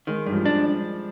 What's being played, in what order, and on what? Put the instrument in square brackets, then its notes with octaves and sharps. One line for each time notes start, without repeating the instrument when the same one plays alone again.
[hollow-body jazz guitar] D#3 [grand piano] G#3
[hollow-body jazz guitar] G2
[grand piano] F3
G3
[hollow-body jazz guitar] D4